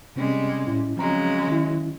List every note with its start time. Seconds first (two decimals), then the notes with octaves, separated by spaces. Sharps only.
0.16 C3 G3 G#3 C4 C#4
0.67 A2 C#4 E4
0.97 C#3 F3 F#3 G#3 C4 A#5
1.48 D#3 C#4 E4